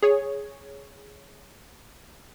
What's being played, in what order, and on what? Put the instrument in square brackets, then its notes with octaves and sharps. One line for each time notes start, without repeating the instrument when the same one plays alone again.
[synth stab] G#4 C#5